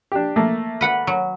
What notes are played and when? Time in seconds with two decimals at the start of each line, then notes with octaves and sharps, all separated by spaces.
0.12 D4 G4
0.36 A3 A#3
0.81 B4 F#5 B5
1.07 F#3